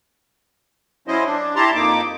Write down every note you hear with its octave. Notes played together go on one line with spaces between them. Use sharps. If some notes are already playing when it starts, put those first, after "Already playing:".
F#3 C#4 E4 C5 D#5
D4
E4 G4 A5 A#5 C6
F2 A#3 D#4 D6